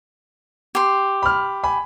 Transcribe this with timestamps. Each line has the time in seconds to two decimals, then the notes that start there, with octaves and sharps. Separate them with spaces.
0.75 G4 C6
1.23 B5 F6
1.63 G#5 B5